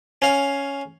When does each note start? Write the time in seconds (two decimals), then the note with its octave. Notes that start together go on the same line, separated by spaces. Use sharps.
0.22 C#4 F5